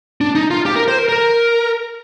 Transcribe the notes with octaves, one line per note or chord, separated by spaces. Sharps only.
D4
D#4
F4
G4
A#4
C5
A#4
A#4